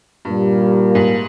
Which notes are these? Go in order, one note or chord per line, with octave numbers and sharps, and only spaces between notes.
G2 A#2 G3 A#3
G#2